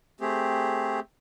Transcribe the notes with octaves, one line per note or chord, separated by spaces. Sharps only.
A3 C4 G4 G#4